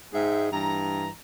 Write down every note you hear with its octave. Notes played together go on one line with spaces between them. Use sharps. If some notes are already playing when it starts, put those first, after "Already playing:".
G#2 G#3 G#4 E5 G5
G2 E3 A#5